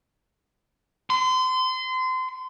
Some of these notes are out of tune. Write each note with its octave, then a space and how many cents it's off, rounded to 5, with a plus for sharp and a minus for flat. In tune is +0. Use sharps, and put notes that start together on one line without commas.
C6 -30